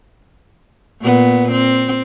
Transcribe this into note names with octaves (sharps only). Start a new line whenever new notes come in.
A#2 B3
C4